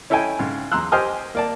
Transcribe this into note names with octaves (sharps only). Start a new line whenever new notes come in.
C#4 E4 A4 D#5 G5 G#5
G#2 C#3
E2 A#5 C6 E6 F#6
G4 C5 D#5 G#5 D#6 F6
A#3 D5 A5